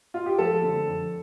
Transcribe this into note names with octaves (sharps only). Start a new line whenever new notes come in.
F4
G4
F3 A4
D3
F2